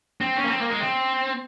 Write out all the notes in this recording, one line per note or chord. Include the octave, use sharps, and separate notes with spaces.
C4
C#4
A#3
C4
A#3
G#3
C4